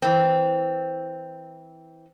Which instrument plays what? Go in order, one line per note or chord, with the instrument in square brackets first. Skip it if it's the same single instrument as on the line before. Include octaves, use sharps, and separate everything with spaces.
[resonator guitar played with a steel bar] E3 C4